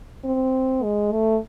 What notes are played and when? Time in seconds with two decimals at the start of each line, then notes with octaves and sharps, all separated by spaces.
0.25 C4
0.83 G#3
1.12 A3